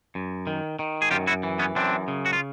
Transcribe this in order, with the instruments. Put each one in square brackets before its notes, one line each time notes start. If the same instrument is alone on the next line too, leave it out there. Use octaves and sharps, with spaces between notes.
[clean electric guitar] F#2
D#3
D#3
G#4
F#2 F4 G4
E4 F#4
E3
B3 C#4
F#2 C4 D4
C#3
F#4
F4